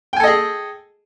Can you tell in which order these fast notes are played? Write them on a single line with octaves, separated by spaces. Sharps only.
G5 G#5 A4 D#5 G#4